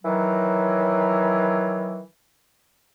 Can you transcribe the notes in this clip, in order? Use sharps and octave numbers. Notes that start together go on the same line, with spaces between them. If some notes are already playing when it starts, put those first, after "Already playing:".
D#3 E3 F#3